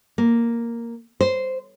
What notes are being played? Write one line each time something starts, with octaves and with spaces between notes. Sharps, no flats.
A#3
C5